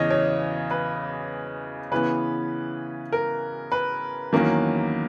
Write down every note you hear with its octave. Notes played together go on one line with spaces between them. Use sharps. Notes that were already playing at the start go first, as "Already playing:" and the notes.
Already playing: E2 C#3 E3 C#5 D#5
C#5
B4
C#3 E3 B3 B4
A#4
B4
E2 D#3 F#3 A#3 C#4